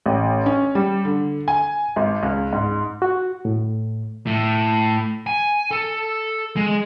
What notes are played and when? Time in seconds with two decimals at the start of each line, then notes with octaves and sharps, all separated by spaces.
0.06 A1
0.46 C#4
0.75 G3
1.05 D3
1.48 G#5
1.96 G#1
2.23 C#2
2.53 G#2
3.02 F#4
3.45 A2
4.27 A2
5.27 G#5
5.71 A4
6.56 G#3